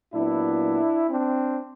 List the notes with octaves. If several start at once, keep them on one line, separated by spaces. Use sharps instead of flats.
A#2 F#3 B3 D4 E4
C4 D4